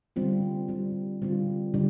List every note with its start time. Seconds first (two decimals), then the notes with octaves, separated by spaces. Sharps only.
0.16 D3 G3 C4 F4
0.68 D3 G3 C4 F4
1.22 D3 G3 C4 F4
1.74 D3 G3